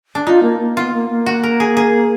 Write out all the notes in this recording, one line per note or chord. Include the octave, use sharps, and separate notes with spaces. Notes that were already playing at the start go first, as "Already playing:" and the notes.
D4
D#4 F4
A#3
A#3
B3 F4
A#3
A#3
F#4
A#4
G#4
G#4